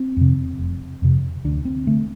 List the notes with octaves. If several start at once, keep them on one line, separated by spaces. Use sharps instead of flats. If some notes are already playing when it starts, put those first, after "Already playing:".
Already playing: C4
F2 C3
F1
F2 C3
D2 D4
C4
D3 A3